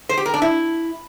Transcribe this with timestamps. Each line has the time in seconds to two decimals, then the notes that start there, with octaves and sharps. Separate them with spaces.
0.09 C5
0.17 G4
0.26 A#4
0.34 D4
0.42 E4